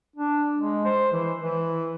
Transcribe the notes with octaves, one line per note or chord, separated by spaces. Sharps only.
D4
G#3
C5
E3
E3